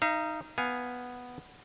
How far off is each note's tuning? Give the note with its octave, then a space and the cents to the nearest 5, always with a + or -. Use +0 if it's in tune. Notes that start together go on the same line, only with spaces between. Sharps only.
D#4 +0 F5 -40
B3 +0 F5 +0 G#5 +0